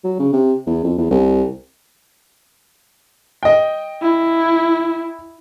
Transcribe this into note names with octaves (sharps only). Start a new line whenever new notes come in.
F#3
C#3
C3
E2
F2
E2
C2
D#5 G5
E4